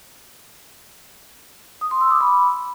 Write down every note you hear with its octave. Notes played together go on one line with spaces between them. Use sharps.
D#6
C6
E6
D6
B5